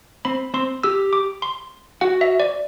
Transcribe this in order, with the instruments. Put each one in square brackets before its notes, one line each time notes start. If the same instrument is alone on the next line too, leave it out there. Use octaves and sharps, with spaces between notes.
[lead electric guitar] C4 [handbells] B5
[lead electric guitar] C4 [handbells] C6
[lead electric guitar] G4 [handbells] E6
[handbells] D6
C6
[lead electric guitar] F#4 [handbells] F#5
[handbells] E5
D5